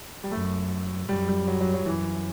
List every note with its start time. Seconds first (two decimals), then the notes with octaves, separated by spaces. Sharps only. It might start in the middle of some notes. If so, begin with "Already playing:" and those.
0.23 G3
0.31 F#2 A3
1.09 F#2 G3
1.28 G3
1.48 F#3
1.60 F#3
1.74 F#3
1.86 F#2 E3